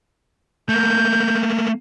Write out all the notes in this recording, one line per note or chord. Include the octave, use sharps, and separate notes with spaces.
A3 A#3 G6